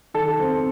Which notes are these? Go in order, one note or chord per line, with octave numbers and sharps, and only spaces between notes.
D#3 A4
C4